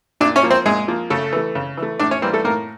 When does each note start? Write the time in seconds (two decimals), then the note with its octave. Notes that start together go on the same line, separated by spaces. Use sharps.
0.21 A#2 D4 D5
0.36 C#4 C#5
0.43 F3 A#3
0.51 C4 C5
0.66 A#2 G#3 G#4
0.88 F3 A#3
1.10 C#3 A3 A4
1.33 E3 A3
1.55 C#3
1.77 E3 A3
1.99 A2 D4 D5
2.11 C#4 C#5
2.22 E3 G3 A#3 C4 C5
2.33 A3 A4
2.45 A2 A#3 A#4